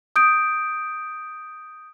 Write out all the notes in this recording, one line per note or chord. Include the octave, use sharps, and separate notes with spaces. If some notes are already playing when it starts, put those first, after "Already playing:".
D#6 G6 D7